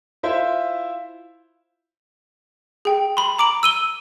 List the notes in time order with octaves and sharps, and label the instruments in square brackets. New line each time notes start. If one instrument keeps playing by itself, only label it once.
[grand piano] E4 F4 C5 E5
[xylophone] G#4 G5
B5 C6
A#5 D6 D7 F#7
E6 D#7 G7